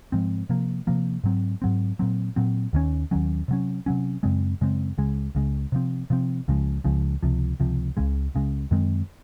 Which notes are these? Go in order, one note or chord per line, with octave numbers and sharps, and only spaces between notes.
G#2 F3 G#3 C4
C3 F3 A#3
C3 F3 A#3
G#2 F#3 C4
G#2 F#3 C4
A#2 F#3 C4
A#2 F#3 C4
D#2 D#3 F#3 C#4
D#2 D#3 F#3 C#4
C3 F#3 C#4
C3 F#3 C#4
F#2 C#3 G#3 C4
F#2 C#3 G#3 C4
C#2 C#3 G#3
C#2 C#3 G#3
C3 F3 C4
C3 F3 C4
C#2 C#3 F3 G#3
C#2 C#3 F3 G#3
C#2 C3 F3
C#2 C3 F3
C#2 C#3 G#3
C#2 C#3 G#3
F#2 D#3 G#3 C4